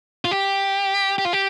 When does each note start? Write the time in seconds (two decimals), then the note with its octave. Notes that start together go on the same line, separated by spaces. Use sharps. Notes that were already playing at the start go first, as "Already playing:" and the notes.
0.25 F4
0.31 G4
1.18 G4
1.25 F4
1.33 G4